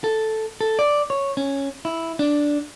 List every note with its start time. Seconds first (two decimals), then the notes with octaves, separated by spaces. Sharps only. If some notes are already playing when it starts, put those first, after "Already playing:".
0.04 A4
0.61 A4
0.79 D5
1.10 C#5
1.37 C#4
1.85 E4
2.19 D4